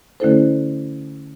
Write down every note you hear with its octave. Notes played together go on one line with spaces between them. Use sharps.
D3 A3 C#4 E4 A4 C5